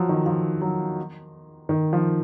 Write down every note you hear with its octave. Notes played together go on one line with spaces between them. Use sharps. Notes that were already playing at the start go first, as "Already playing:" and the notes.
Already playing: F3 F#3
D#3
F3
F#3
D#3
F3